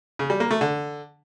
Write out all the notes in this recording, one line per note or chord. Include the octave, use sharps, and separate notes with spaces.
C#3
G3
A#3
A3
D3